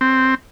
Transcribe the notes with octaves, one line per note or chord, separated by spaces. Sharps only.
C4